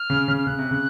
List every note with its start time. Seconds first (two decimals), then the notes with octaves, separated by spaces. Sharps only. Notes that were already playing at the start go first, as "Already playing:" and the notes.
Already playing: F6
0.10 C#3
0.28 C#3
0.37 F6
0.46 C#3 F#6
0.59 C3
0.71 C#3